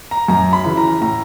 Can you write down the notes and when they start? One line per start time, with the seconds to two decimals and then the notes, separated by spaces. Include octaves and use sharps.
0.11 A#5
0.28 F#2 A#5
0.53 B5
0.65 C#3 E3
0.77 A#5
1.01 A2 A#5